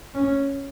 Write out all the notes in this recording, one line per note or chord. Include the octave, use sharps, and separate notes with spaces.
C#4